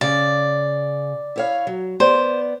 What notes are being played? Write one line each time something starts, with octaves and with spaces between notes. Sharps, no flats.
C#3 D5
E4 C#5 F5
F#3
B3 C5 D5